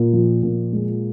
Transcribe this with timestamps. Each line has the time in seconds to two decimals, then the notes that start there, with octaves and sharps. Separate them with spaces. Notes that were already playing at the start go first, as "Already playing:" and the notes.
Already playing: A#2
0.13 F3
0.43 A#2
0.73 G#3